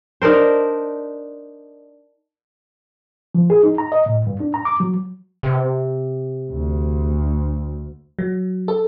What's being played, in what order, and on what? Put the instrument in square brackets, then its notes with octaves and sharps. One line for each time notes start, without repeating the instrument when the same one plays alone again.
[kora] D4 D#4 A#4 C5
[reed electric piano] F3
G#4
D#4
A#5
D#5
A2
G2
D4
A#5
D6
F#3
[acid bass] C3
[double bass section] D2
[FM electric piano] F#3
A4